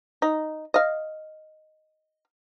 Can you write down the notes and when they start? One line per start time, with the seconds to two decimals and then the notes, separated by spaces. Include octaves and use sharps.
0.22 D#4
0.74 D#5 F5